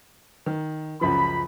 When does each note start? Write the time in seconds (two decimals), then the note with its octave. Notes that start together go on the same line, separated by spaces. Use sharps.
0.46 D#3
1.01 C#2 F#2 F3 B5